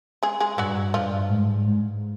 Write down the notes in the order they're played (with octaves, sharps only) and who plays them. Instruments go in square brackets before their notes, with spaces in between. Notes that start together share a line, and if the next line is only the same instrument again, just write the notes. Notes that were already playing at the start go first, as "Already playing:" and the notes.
[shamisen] G#3 G#4
G#3 G#4
[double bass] G2 [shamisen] F#3 F#4
[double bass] G2 [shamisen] F3 F4
[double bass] G#2
G#2